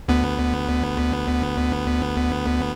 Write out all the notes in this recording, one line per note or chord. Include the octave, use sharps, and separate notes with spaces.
D2 B3